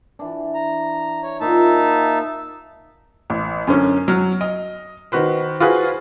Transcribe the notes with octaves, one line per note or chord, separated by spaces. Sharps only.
E3 D4
A#5
C#5
A#2 D#4 C5 E5 F5 A5
A1
F#2 D3 C#4
F#3 F6
D#5
D#3 F#4 B4 C5
F4 F#4 G#4 B4 C5